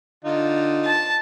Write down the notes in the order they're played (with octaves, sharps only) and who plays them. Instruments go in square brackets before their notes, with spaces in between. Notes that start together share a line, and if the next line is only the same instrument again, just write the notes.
[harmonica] D3 D#4 F4
[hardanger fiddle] A5